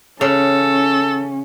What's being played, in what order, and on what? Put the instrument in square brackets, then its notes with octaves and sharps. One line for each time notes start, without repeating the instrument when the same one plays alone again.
[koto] C#3 [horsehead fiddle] C#4 [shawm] A4